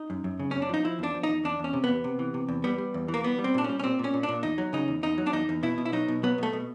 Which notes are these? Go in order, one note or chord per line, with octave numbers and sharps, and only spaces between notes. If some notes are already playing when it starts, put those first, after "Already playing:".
Already playing: D#4
F#2
F#2
C#3
F#2 C#4
D4
F3 D#4
F3 E4
E2 D4
F3
D#4
E2
E2 D4
E2 C#4
C3
E2 B3
C3
E3
C3
E2
G3 B3
G3
E2
E3
A#3
G3 B3
G3
C4
A#2 D4
G3 C#4
C#4
A#2 C4
A#2 C#4
A#2
D4
A#2
E2 D#4
F#3
C#3 D#4
E2
E2 D#4
F#3
D4
E2 D#4
E2
B2 E4
B2
E4
F#3 D#4
B2
F#3 B3
B2 A3
B2